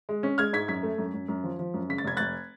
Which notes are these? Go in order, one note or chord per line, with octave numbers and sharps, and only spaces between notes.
G#3
C#4
G#3 F6 G#6
G#2 G#6 B6
F#2 G#6 B6
A3
F#2
F#2
F#2
F3
F3
F#2
C#3 B6
A6
F1 G#6
F1 F#6 A6